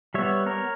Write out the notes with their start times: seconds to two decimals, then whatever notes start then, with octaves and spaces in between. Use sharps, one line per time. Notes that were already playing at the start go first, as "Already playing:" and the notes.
0.14 G3 B3 C#5 E5
0.47 A#4 C#5